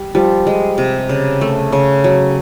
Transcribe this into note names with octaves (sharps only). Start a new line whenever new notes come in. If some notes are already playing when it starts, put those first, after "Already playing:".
Already playing: G3
F3 G3
G#3
C3
C#3
A3
C#3
F#3